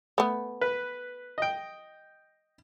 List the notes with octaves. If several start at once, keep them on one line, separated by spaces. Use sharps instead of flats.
A3 B3
B4
D#5 G5